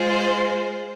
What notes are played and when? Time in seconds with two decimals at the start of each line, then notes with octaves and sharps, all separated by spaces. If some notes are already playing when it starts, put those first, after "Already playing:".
Already playing: G#3 F4 G#4 C5